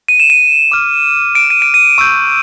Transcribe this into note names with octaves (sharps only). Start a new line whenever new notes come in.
D#7
E7
D#7
D6 F6
D7
D#7
D7
D#7
C#6 E6 G6